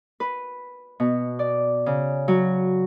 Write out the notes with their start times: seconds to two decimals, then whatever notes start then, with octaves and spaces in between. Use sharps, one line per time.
0.20 B4
1.00 B2
1.39 D5
1.86 C#3
2.28 F#3